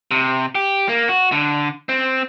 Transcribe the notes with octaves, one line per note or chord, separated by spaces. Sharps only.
C3
G4
A#3
F#4
D3
C4